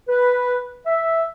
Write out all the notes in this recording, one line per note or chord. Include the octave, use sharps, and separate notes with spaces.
B4
E5